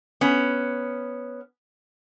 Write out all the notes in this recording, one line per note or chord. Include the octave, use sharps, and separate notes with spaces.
B3 C#4